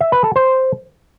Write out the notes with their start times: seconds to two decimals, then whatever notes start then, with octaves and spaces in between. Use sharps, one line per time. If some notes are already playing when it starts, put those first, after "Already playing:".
0.01 E5
0.12 B4
0.24 A4
0.36 C5